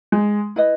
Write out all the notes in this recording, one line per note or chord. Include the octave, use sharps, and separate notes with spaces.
G#3
E4 B4 D#5